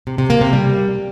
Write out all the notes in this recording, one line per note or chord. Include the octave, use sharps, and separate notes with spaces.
C3
C3
A#3
C3
G3